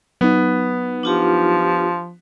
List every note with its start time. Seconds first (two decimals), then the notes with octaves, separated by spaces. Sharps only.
0.21 F#3 B3 D#4
1.03 F3 D4 F4 G4